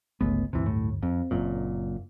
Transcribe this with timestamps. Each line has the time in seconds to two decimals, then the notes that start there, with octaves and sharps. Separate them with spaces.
0.21 G1 C#2 A3 B3
0.53 D1 D2 G2 C3 E3
0.66 A2
1.03 F2 C4
1.31 F#1 F#2 A#2